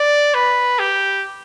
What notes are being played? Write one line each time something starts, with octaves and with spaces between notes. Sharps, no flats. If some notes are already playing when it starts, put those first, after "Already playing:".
Already playing: D5
B4
G4